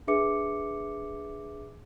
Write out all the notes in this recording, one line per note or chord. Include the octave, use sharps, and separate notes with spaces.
D4 G#4 B4 E5 D6 C#7